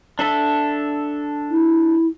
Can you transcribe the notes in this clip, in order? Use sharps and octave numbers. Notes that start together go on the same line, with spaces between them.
D4 A4 E5
E4